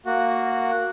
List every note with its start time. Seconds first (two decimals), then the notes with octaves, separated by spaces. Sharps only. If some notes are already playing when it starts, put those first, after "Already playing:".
0.06 A#3 F#4